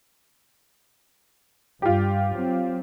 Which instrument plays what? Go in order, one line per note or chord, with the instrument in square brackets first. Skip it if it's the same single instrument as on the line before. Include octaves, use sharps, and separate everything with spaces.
[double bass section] G2 [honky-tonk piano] F4 G4
[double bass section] F#3 C4